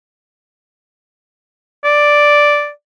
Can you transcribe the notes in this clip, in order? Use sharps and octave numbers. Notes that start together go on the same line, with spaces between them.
D5